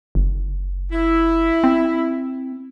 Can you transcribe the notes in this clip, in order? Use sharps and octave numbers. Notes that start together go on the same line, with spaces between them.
F#1
E4
C4